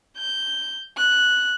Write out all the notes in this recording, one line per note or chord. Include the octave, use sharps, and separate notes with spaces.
G6
F#6